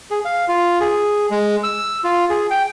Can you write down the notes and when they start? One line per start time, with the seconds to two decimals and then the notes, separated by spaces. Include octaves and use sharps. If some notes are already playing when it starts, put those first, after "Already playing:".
0.11 G#4
0.25 F5
0.48 F4
0.80 G#4
1.31 G#3
1.64 E6
2.04 F4
2.30 G#4
2.51 G5